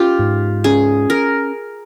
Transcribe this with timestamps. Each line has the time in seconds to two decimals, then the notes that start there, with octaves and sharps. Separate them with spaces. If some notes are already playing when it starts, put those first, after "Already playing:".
Already playing: C#4 F4 G4
0.19 G#2
0.64 C#4 G#4
1.10 A#4